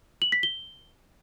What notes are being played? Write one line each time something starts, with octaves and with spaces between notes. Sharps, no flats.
F#7
B6
G7